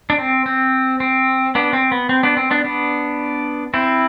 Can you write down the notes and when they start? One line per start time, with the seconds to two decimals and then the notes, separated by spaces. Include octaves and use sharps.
0.10 D4
0.18 C4
0.46 C4
1.00 C4
1.55 B3 D4
1.73 C4
1.92 B3
2.09 C4
2.23 B3 D4
2.37 C4
2.51 B3 D4
2.64 B3 D4
3.74 C4 E4